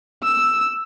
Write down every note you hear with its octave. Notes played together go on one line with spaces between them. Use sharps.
E6